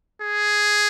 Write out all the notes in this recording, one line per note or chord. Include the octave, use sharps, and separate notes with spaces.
G#4